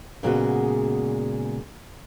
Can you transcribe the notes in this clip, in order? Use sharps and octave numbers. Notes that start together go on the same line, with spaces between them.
A#2 C#3 G#3 B3 F#4